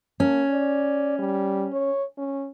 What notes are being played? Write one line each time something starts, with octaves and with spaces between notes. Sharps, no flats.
A#3 C#4
D5
G3
C#5
C#4